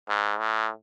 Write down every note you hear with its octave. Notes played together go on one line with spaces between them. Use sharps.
G#2
A2